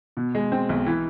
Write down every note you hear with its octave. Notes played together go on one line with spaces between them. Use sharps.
B2
G#3
C4
B1
E3